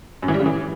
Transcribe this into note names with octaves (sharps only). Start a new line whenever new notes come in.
F#2
E3
G3
C#3
E3